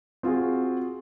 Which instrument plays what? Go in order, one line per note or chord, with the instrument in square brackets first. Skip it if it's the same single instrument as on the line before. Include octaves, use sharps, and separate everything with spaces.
[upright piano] C4 F4 F#4 G#4